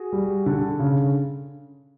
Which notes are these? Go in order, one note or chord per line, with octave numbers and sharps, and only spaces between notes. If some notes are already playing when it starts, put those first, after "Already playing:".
Already playing: F#4 G#4
G3
D3
C#3